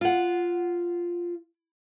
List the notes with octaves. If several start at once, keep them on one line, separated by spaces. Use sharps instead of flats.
F4 F#5